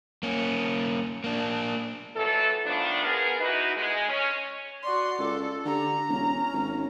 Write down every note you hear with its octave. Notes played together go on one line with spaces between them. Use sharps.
A#3 C#4
A#3 D4
F2 E3 F#3 A4
D#3 F3 A3 B3 D4
B3 G#4 A#4
E3 D#4 E4 F#4 B4
G#3
C#4
F#4 D5 C6
C#2 A4
D3 G4 A#5
E1 C#4
G#1